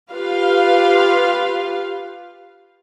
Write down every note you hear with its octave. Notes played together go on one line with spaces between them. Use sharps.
F4 G4 B4 F5